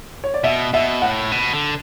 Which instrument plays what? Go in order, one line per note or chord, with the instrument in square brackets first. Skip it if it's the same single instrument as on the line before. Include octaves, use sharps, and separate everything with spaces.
[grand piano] C#5
D5
[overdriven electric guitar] B2 [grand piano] E5
[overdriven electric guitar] B2 [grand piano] E5
[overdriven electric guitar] A2 [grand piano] F#5
[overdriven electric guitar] B2
D3